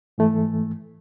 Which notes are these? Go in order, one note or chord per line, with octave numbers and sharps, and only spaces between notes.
G#2 E3 A3